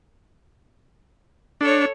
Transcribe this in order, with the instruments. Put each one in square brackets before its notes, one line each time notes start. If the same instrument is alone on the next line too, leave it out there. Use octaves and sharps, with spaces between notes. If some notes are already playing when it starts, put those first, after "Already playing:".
[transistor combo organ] D4 [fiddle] A4 C#5